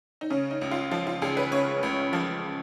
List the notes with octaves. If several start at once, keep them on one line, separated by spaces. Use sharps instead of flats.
D#4
C#3 C#4
D#4
C#2
F4
F3 F4
F4
C#2 G#4
B4
C#3 C#5
C#2
F3